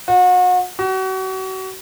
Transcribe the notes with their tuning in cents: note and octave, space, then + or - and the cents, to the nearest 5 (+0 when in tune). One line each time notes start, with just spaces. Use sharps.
F#4 -35
F#4 +35